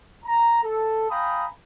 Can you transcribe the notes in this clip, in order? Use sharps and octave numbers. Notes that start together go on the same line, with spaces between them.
A#5
A4
F5 G5 G#5 A#5 B5 D#6